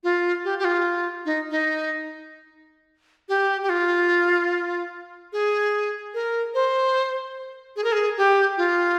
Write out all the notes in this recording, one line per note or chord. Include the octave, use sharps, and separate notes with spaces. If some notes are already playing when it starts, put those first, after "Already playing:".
F4
G4
G4
F4
D#4
D#4
G4
G4
F4
G#4
A#4
C5
G#4
A#4
G#4
G4
F4